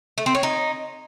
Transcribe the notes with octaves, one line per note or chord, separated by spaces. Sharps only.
A3
C4
C#5
D#4